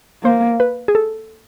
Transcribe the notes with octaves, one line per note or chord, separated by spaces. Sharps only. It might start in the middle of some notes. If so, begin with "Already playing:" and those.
A#3 C5
B4
G#4
A4